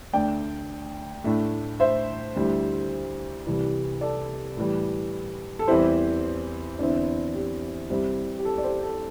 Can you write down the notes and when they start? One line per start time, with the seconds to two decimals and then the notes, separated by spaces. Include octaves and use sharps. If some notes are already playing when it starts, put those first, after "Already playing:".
0.13 D2 D3 A3 D5 G5
1.24 A2 A3 D4
1.80 C5 E5
2.36 D2 D3 G3 E4
3.47 C2 C3 E3 G3
4.01 A4 D5
4.57 A2 E3 G3
5.59 A4
5.67 E2 E3 G3 C4 E4 G4 C5
6.79 E2 D3 C4 E4
7.35 G4
7.90 C2 C3 G3 C4 E4
8.39 G4
8.45 A4
8.58 D5
8.63 G4 C5
8.83 A4